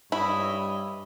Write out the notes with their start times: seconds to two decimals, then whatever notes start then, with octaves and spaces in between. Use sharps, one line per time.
0.12 G2 E4 C#5 D#5 E5 B5